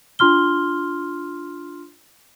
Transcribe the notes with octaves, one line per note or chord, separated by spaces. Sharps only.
D4 F4 C6 F6 G7